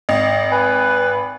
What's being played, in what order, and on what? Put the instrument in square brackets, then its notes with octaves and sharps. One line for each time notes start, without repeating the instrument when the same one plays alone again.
[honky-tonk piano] G#1 [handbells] D#5
[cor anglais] B4 [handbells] G#5